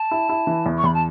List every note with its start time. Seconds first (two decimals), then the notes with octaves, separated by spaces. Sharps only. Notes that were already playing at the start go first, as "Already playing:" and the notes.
Already playing: A5
0.11 E4
0.29 E4
0.47 E3
0.66 E2
0.77 C#6
0.84 E2 B5
0.94 A5